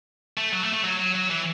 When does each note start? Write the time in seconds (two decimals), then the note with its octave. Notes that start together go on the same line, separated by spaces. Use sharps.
0.37 A3
0.53 F#3
0.63 A3
0.73 A3
0.84 F#3
0.99 F#3
1.15 F#3
1.30 E3